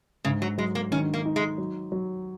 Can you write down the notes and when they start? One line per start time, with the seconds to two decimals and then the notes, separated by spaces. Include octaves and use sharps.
0.25 G#2 C#3
0.42 F#3
0.58 F#3 G#3
0.75 A#3
0.91 D#3 C#4
1.14 A#3
1.26 D#4
1.36 G#3
1.58 F#3
1.92 F#3